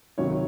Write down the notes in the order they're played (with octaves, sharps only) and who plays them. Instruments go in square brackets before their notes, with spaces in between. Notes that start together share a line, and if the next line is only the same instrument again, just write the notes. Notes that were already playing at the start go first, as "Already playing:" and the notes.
[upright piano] C#2 C3 D#3 F#3 C#5